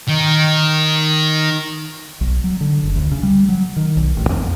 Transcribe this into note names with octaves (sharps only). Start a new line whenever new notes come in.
D#3
B1
F#3
D3
F#1
D2
C#3
G3
F#3
D#3
B1
A1
F2